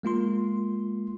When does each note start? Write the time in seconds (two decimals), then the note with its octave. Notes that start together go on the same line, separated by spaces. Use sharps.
0.03 G#3 A#3 F4 C6